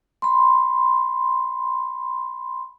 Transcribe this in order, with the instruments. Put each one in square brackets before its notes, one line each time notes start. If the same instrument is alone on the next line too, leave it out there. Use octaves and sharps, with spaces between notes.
[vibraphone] B5 C6